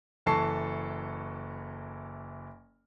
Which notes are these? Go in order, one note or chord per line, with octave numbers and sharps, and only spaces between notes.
F#1 E3 A4 A5 C#6 C7